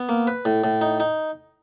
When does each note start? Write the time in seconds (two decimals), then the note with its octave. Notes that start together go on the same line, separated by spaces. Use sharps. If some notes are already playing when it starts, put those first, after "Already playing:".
Already playing: B3
0.09 A#3
0.27 B4
0.45 A2
0.64 A2
0.81 D#4
1.00 D#4